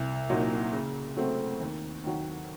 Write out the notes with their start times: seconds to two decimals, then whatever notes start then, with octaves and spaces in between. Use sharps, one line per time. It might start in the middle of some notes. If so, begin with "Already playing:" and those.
Already playing: C2
0.29 A#2 F#3 A#3 D#4
0.73 C#3
1.17 F#3 A3 C4
1.61 D#2
2.04 D#3 F#3